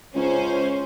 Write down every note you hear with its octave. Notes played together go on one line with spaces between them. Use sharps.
C#2 C#4 C5